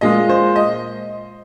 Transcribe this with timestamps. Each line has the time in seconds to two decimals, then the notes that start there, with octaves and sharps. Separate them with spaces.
0.01 A#2 G#3 F4 D#5
0.29 C5
0.56 D#5